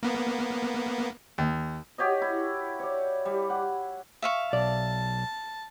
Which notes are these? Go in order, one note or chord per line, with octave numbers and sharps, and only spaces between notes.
A#3 B3
D#2
F#4 G4 C#5 D#5
E4
C#5 D5
G3
F#5
E5 F5 C#6
B1 D5 A5